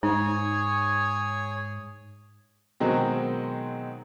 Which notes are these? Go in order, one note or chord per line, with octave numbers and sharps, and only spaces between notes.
G#2 D#4 G#4 C#5 G#5
B2 D#3 F#3 G#3 C4